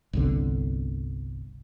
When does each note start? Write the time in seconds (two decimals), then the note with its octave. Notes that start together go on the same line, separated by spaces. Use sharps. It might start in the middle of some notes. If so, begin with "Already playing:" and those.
0.13 G1 C2 D3